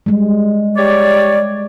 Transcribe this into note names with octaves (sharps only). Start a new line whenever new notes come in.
G3 G#3
G4 C#5 D5